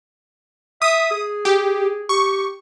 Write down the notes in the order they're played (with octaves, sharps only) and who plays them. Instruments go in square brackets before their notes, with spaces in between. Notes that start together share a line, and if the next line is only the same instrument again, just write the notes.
[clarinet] E5 [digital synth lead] D#6
[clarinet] G#4
[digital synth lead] G4
[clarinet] G4 [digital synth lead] C#6